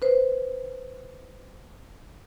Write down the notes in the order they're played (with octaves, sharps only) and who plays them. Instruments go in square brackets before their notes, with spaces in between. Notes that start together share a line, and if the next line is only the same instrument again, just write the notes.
[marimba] B4 C5